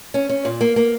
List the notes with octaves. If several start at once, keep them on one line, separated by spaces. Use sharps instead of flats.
C#4
C#4
A#2
A#3
A#3